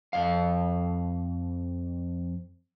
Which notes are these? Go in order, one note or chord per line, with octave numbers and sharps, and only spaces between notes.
F2 F5